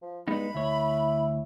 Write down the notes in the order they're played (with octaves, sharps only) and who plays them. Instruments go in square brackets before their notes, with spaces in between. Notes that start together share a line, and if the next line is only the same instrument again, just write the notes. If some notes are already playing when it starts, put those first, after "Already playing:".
[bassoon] F3
[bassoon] G2 [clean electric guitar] G#3 B3 D#4 [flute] B5
[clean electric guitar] D2 C#5 [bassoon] E4